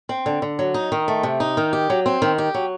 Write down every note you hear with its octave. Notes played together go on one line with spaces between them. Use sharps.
C4
D3
D3
F#3
D#4
D#3
A3
C3
D#4
D#3
G4
F#3
C4
D#3
G4
F#3